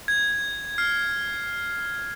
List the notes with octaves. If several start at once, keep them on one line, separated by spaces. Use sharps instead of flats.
G#6
F6 C7